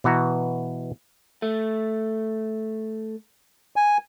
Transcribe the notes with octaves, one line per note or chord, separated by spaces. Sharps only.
B2 E3 F#4 A#5
A3
G#5